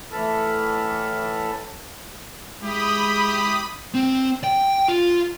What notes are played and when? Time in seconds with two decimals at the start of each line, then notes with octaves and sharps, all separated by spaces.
0.12 A2 E3 A4 A5 B5 F6
2.63 G#3 E4 G4 B5 D#6
3.94 C4
4.44 G5
4.88 F4